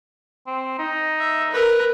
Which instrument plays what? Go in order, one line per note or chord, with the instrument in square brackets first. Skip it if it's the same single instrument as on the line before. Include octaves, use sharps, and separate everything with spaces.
[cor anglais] C4
D#4
[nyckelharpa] E5
A#4 B4